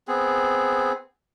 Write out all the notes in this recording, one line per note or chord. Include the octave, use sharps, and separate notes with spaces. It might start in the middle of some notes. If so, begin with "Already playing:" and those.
B3 C4 G#4